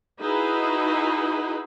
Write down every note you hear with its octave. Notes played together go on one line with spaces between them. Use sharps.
D#4 E4 F#4 G#4 B4